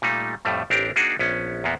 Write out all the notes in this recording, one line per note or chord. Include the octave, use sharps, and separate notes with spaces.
A#2 G3 A3 D#4
F2 A2 G3 A3
A1 C4 D4 G4 A#4
A#3 D4 D#4 F#4 G#4
A#1 B3 C#4
E2 A#2 A#3 B3